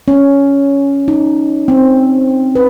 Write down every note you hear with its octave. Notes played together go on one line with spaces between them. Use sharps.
C#4
D#4
C4
B4